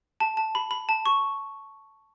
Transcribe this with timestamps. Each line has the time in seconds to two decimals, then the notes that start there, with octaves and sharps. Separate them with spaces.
0.20 A5
0.37 A5
0.55 B5
0.71 B5
0.89 A5
1.06 C#6